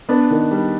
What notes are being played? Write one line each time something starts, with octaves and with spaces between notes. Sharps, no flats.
B3 D4
D#3
G3